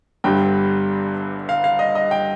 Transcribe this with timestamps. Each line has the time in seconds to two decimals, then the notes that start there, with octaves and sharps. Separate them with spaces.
0.24 G1 G2 D3 G3 G5
1.49 F5
1.64 F5
1.79 D#5
1.95 D#5
2.11 G5